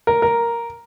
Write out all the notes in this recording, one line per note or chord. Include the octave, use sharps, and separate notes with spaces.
A#4
A#4